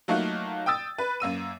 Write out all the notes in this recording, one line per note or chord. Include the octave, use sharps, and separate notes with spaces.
F#3 A3 A#3 D#4 F4 F#4
G5 D#6 E6 A6
B4
F#2 A#3 E6 D#7